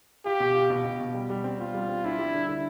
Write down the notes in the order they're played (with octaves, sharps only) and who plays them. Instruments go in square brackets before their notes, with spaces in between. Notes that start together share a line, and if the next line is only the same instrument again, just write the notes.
[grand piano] F4 [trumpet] G4
[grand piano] B2
F4
B2
B2
B2
G3
G3
C4
[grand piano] C4 [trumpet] F4
[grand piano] G3
C4
[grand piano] D4 [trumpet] E4
[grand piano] G3
D3
D3